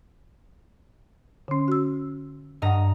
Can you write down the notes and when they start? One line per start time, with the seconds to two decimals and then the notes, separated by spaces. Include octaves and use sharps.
1.48 D3 C#4
1.68 F#4 E6
2.62 G2 D#5 F#5 A#5 D#6